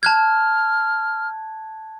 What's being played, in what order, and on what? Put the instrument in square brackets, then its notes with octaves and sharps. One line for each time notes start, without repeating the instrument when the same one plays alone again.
[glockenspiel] A5 F#6 G#6 [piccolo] F6